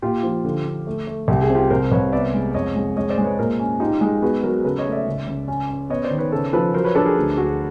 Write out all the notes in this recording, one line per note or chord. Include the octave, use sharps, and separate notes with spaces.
A#2 F4 G4
F3
D3
D3
A3
A3
C2 G4
G#4
C3
F4 G4
C2 A#4 C5
C2 B4 C#5
B3 D5 E5
G#3
F2 C#5 D#5
G#3
G#3 C#5 D#5
C5 D5
G#3
B4 C#5
A#2 A#4 C5
C#4
D#4 F4 G4
G#3
B3 F#4 G#4
F#3 G#4 A#4
C#3 A4 B4
C#5 D#5
A3
D5 E5
C#2
C#2
C#4
C#4
B3 C#5 D#5
C5 D5
D#3
B4 C#5
C#3 A4 B4
F3 A4 B4
F#3 A#4 C5
B4 C#5
D4 A4 B4
G#4 A#4
D2
D2 F#4 G#4